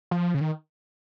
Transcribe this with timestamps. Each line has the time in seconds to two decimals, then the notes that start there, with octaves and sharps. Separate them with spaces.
0.11 F3
0.34 C#3
0.41 D#3